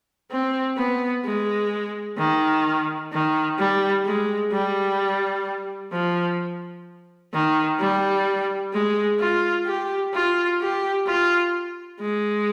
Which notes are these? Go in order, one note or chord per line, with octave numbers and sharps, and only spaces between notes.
C4
B3
G#3
D#3
D#3
G3
G#3
G3
F3
D#3
G3
G#3
F4
G4
F4
G4
F4
G#3